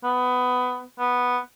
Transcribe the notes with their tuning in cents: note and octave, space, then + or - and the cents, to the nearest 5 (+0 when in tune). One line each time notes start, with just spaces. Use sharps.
B3 +15
B3 -5